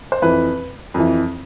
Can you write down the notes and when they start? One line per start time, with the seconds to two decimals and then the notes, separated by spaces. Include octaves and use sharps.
0.12 C5
0.22 F2 E3 B4
0.94 F2 E3